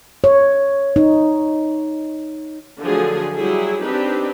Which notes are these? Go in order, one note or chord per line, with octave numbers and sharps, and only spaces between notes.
C#5
D#4
D3 F3 F#3 A3 G#4 A4
F#3 G3 E4 G#4
C4 D4 D#4 G4 B4